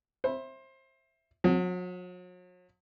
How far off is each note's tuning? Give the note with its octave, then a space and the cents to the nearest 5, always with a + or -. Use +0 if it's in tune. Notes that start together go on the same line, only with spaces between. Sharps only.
C5 +25 E5 +0 B5 +0
F#3 -45 F#5 +0